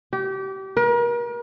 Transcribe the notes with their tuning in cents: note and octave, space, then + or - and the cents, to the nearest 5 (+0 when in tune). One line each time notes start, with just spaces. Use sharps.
G4 -30
A#4 +40